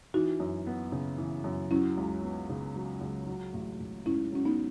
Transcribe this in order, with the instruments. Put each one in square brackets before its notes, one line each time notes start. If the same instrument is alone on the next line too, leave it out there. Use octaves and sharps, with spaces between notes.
[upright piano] E3 [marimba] D#4 F#4
[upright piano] F#2
B3
C#3
E3
F#2
[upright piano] F#3 [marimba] C#4 E4
[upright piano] C#2
B3
C#3
F#3
C#2
F#3
A1
A1
[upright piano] G#2 [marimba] C#4 E4
[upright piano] F#3 [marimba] C#4
[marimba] B3 D#4